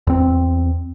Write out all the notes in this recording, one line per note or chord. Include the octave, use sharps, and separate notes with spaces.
E2 C4